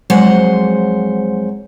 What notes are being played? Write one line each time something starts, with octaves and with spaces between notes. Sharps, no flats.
F2 F#3 G#3 C5 F#5